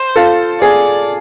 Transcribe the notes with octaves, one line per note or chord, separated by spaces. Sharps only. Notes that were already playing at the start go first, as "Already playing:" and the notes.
Already playing: C5
F4 A4
G#4 D5